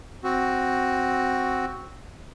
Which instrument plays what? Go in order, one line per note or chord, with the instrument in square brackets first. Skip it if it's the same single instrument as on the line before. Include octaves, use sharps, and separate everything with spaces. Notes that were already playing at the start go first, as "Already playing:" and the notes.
[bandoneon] C4 F#4